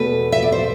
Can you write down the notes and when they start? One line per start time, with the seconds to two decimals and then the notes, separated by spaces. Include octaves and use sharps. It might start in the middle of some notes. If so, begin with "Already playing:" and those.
Already playing: E2 B2 A3 B4
0.32 E5
0.42 D5
0.52 C5